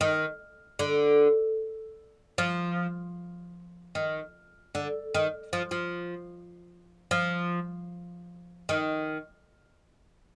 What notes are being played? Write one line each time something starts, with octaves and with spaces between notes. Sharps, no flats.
D#3
D3
F3
D#3
D3
D#3
F3
F3
F3
D#3